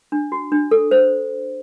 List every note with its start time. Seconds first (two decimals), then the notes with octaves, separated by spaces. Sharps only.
0.12 D4
0.32 F#4
0.52 D4
0.71 A4
0.91 C5